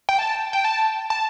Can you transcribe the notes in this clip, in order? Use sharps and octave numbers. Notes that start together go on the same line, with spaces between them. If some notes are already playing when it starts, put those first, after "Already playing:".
G5
A5
G5
A5
A5